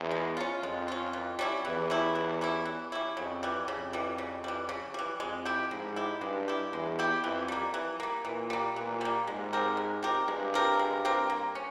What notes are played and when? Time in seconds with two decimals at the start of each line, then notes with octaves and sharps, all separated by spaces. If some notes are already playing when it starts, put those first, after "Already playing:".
Already playing: E2
0.11 G#3
0.37 C#4 F4
0.63 F2 G#3
0.88 C#4 F4
1.13 E3
1.39 G3 C#4 E4
1.65 E2 E3
1.90 G3 C#4 E4
2.15 E3
2.41 G3 C#4 E4
2.65 E3
2.92 G3 C#4 E4
3.17 F2 C#3
3.43 E3 G3
3.68 F2 C#3
3.93 E3 G3
4.18 C#3
4.44 E3 G3
4.69 C#3
4.94 E3 G3
5.20 F2 G#3
5.45 E4 G4
5.71 G#2 G#3
5.96 E4 G4
6.21 G2 G#3
6.48 E4 G4
6.72 E2 G#3
6.99 E4 G4
7.24 F2 E3
7.48 G3 A#3
7.74 E3
8.00 G3 A#3
8.25 A#2 E3
8.50 G3 A#3
8.76 A#2 E3
9.01 G3 A#3
9.27 G#2 G#3
9.53 C4 G4 A#4
9.77 G#3
10.03 C4 G4 A#4
10.28 G2 G#3
10.54 C4 G4 A#4
10.79 G#3
11.05 C4 G4 A#4
11.30 A#3
11.55 C#4